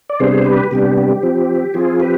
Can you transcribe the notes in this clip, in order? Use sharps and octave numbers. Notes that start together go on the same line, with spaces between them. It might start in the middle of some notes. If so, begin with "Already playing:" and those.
D5
C3 G3 B3 D4 G#4 C5
G4 B4
C3 G3 B3 D4 G4
G4
F3 C4
F3 C4 F4 G#4
G4 B4